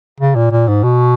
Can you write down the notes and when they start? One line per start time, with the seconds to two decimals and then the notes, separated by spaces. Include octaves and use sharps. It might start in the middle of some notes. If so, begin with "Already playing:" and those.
0.20 C#3
0.36 A#2
0.52 A#2
0.68 G#2
0.83 B2